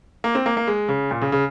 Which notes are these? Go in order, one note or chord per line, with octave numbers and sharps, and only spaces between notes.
A#3
C4
A#3
A#3
G#3
C#3
A#2
C#3
C#3